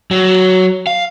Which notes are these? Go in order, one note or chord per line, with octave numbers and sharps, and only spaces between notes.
F#3
F5